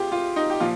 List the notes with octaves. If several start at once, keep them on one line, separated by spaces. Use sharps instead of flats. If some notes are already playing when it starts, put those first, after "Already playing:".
Already playing: C3 F4 G4 G#4
F4
D#4
G4
A#2 F3 F4